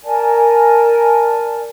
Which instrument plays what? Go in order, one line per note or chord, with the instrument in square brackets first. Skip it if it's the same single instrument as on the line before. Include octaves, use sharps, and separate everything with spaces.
[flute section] A#4 D5 G#5 A5